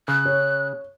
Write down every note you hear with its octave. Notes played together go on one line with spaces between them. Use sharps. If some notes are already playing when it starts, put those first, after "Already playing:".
C#3 F#6
C#5